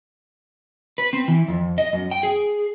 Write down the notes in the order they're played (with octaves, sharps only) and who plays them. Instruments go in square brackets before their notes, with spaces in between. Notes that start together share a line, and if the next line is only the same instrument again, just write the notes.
[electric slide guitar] B4
C4
E3
F2
D#5
F#2
G5
G#4